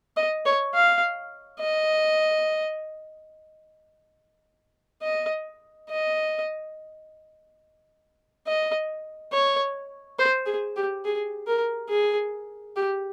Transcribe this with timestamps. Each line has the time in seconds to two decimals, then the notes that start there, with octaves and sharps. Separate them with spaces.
0.17 D#5
0.46 C#5
0.75 F5
1.60 D#5
5.03 D#5
5.90 D#5
8.47 D#5
9.33 C#5
10.19 C5
10.46 G#4
10.76 G4
11.05 G#4
11.47 A#4
11.90 G#4
12.76 G4